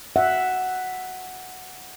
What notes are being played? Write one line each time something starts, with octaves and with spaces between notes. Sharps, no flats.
E5 F#5